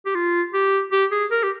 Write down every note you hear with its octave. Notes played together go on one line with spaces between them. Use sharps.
G4
F4
G4
G4
G#4
A#4
G4